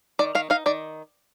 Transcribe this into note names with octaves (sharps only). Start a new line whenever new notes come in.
D#3 D5
D#3 F5
D#4 F5
D#3 D5